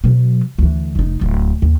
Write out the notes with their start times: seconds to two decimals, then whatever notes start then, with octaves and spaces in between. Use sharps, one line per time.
0.04 B2 F#3
0.58 D2 E3
0.95 F1 D#4
1.21 D1
1.62 D#2